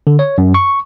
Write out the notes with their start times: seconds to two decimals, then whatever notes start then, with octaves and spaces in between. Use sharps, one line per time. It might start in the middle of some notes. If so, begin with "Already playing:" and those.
0.07 D3
0.19 C#5
0.38 F#2
0.54 C#6